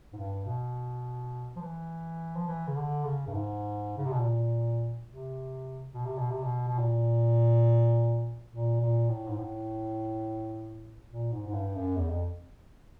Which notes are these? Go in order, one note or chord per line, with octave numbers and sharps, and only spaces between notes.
G#2
G2
B2
F3
E3
F3
E3
C#3
D3
C#3
G2
G#2
C#3
C3
B2
A#2
C3
B2
C3
B2
C3
B2
B2
A#2
A#2
A#2
A2
G#2
A2
A#2
G#2
G#2
G2
F#2
E2
F2